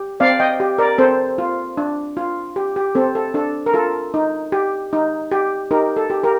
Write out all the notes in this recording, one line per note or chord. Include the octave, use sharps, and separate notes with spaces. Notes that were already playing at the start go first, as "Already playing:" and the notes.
Already playing: G4
C4 D5 F5
D#5 G5
G4
A#4 D5
C4 A4 C5
F4
D4
F4
G4
G4
C4 A4
A4
D4 A4
A#4
F4 A4
D#4
G4
D#4
G4
D#4 G4 A#4
A4
G4
G4 A#4